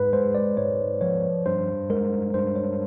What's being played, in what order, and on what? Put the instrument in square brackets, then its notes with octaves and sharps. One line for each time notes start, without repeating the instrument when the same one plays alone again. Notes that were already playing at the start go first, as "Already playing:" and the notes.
Already playing: [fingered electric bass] G#2 [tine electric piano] B4
[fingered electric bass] G#3 [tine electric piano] C5
[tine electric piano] D5
[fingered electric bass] G#2 [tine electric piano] C#5
[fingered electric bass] F3 [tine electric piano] C#5
[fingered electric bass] G2 [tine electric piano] C5
[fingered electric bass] G#3 [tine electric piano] A#4
[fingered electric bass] G2 [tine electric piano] C5
[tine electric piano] C#5